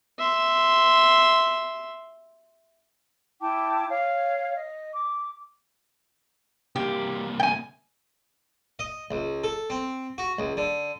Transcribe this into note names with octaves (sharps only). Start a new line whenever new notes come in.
E5 C6
E4 G5 A5 D6
C#5 F5
D#5
D6
C2 A#3 G4
G5 G#5
D#5
C#2
A4
C4
F#4
C#2
D3